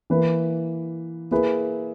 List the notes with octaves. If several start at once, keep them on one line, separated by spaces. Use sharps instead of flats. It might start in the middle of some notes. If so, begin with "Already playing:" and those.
E3 A#3 E4 B4
A#3 E4 G#4 B4